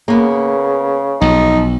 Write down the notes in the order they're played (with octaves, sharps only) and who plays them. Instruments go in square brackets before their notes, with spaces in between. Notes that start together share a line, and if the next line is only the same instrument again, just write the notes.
[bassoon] C#3 [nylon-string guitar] A#3 B3
[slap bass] B1 [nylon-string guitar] F3 [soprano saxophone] D#4